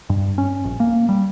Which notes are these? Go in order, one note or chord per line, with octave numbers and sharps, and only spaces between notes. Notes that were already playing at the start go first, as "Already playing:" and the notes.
G2
C#4
A#1
A#3
G3